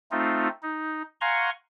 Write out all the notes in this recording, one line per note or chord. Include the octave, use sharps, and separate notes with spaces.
A3 C4 D#4 F4
D#4
F5 F#5 G#5 A#5 C6 C#6